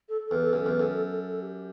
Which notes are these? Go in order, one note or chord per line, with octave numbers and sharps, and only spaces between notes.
A4
A4
E2
A4
F#2
A4
E2
F#2 A4
A4
A4
A4
G4